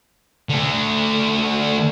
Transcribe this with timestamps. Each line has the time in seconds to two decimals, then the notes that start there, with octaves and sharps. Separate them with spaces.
0.50 D3 A3